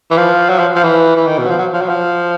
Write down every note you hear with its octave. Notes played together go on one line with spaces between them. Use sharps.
E3
F3
F#3
F3
F3
E3
E3
D#3
B2
F#3
F3
F#3
F3
F#3
F3